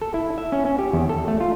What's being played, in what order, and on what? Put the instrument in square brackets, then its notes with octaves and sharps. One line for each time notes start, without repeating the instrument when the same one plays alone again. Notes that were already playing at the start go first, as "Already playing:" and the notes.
[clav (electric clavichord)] A4
E4
E5
C#4
C#4
G4
E2
A4
A3
F4